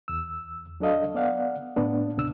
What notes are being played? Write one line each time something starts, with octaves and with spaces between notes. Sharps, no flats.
E2 E6
F#3 D4 A4 D#5 F5
B3 D5 F5 F#5
A2 B3 D4
D#2 C3 D4 E6